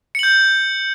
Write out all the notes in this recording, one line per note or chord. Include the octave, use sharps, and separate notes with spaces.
G6 C#7 F#7